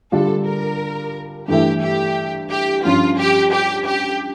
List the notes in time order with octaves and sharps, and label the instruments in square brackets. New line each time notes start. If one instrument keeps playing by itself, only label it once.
[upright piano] D3 G3 D4 F4 [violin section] A4
[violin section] A#4
[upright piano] G2 E3 A3 E4 [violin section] G4
[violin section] G4
G4
[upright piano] G2 F3 C#4 [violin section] F4
[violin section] G4
G4
G4